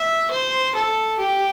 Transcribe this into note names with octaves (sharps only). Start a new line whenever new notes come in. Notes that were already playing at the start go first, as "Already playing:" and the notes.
Already playing: E5
C5
A4
G4